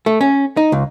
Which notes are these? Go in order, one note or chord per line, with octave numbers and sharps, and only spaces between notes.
A3
C#4
D#4
C#2